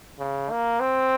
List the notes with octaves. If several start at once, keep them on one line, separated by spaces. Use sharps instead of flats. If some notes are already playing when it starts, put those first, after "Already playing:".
C#3
A#3
C4